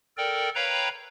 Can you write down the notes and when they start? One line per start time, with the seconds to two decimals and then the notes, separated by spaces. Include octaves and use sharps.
0.17 A4 A#4 D5 G5
0.55 B4 C#5 F5 G5 A#5 B5